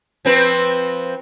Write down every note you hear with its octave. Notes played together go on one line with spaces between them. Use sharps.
F3 C4 B4